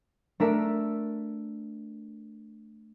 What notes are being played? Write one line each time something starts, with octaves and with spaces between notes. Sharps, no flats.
A3 D4 A#4 E5 A5 D7